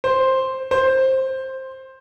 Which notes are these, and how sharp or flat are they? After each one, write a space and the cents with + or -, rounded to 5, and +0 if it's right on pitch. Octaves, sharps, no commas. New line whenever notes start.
C5 +5
C5 +10